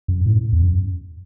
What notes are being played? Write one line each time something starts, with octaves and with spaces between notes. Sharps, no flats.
F#2
A2
E2
F#2